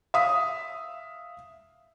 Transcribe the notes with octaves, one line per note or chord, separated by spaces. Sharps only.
E5 F5 D#6